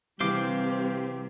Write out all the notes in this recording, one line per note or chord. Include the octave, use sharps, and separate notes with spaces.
C3 E3 G3 C4 G4 C5 F5 D6